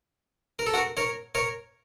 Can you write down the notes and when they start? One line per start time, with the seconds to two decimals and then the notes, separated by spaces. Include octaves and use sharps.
0.59 A#4
0.66 A4
0.74 F#4 A#4
0.97 A#4 C#5
1.35 A#4 C#5